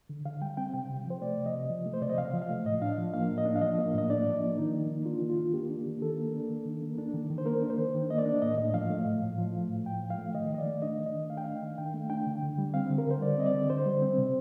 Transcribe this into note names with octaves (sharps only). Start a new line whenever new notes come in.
D3
D3 F5
G3 G5
C4 G5
C3 G5
C3
F3
C5
A3 D5
C3
D#5
C3
F3
A3
C5
C3 D5
D#5
C3 F5
F3
F5
A3
A2 D#5
D4 F5
F3
A#3 F5
A2
D#5
D4
F5
F3 D#5
A#3
A2 D#5
D4 D5
F3
D5
A#3
D#3 D#4
D#3
A#3
D4 F4
D#3
F4
D#3
A#3 G4
D4
D#3
D#3 A4
A#3
D4
D#3
D#3
A#3
D4
D#3
D#3
C5
A#3 A#4
D4
C5
D#3
D#3
A#3 D#5
D5
D4
A2 D#5
A2 D#5
F3 F5
A3
A2
A2
F3
A3
A2
A2 G5
F3
F5
A3
D#3 D#5
D#3 D#5
D5
A3
D4 D#5
D#3
D#5
D#3
A3 F5
G5
D4 F5
D#3
D#3 G5
A3
D4 G5
D3
D3
G3
C4 F5
D3
A#4
D3 C5
G3 D5
C4 D#5
D5
D3
D3 C5
G3
C4
C3